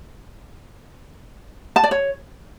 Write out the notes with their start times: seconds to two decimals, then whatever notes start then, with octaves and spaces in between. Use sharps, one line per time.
1.76 A5
1.84 D5
1.91 C#5